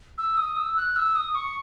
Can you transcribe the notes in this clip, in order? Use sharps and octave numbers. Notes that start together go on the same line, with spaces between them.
E6
D#6
E6
F#6
E6
D#6
C#6